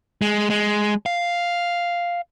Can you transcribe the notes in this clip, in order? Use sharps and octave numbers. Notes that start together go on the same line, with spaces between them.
G#3
G#3
F5